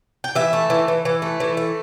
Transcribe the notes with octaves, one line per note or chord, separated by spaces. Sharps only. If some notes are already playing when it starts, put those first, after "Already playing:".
G5
E3 E5
A3
E3
E3
E3
A3
E3
A3